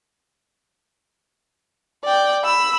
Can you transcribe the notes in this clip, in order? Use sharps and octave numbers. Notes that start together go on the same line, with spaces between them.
D5 G5
B5 E6